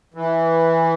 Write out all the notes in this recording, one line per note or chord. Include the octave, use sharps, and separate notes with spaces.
E3